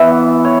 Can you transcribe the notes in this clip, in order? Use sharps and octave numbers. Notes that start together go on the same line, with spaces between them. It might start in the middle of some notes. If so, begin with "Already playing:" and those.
Already playing: E3 B3 D5 E5 F#5
C#5